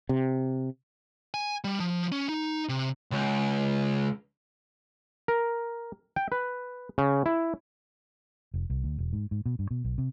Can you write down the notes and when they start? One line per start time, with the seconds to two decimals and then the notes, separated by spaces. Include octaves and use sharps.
0.09 C3
1.34 G#5
1.64 G3
1.80 F3
2.12 C#4
2.29 D#4
2.69 C3
3.12 C#2
5.28 A#4
6.16 G5
6.32 B4
6.98 C#3
7.26 E4
8.54 F1
8.70 C2
8.84 D2
8.98 E1
9.13 G#2
9.31 G#2
9.46 B2
9.59 G2
9.71 B2
9.84 B1
9.98 C3